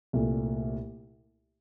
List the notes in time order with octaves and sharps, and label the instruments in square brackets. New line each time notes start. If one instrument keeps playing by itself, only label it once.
[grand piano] C2 A#2 A3